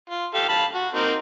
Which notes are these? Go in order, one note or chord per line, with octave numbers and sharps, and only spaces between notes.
F4
G4 A4 F5
F5 A5 B5
F#4
A#3 C4 D#4